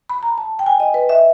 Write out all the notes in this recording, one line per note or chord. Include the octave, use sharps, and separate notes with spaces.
B5
A#5
A5
G5
G#5
D#5
B4
E5